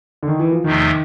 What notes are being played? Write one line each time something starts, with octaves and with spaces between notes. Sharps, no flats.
D3
D#3
E3
F3
E2 C3 D#3 F3 A3